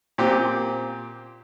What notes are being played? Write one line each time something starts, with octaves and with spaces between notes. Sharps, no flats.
A#2 C4 G4